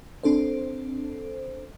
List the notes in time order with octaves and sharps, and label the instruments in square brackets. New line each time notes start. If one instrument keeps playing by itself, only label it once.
[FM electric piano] C4 D4 A4 C5